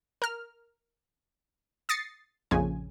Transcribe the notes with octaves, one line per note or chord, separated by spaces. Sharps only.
A#4 F6
D#6 A6 A#6 C7 C#7
A#1 F2 C#3 F3 G#5